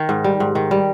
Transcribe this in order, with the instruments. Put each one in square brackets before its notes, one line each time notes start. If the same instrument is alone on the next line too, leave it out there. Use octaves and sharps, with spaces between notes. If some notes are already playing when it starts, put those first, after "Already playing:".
Already playing: [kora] D#3
G#2
G3
G#2
D#3
G3